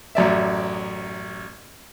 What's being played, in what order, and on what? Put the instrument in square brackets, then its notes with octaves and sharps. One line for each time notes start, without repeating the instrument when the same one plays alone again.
[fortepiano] A1 F#2 D5 E5